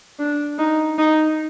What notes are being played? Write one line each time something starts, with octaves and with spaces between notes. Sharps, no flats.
D4
D#4
D#4